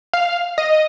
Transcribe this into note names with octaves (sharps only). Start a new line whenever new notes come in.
F5
D#5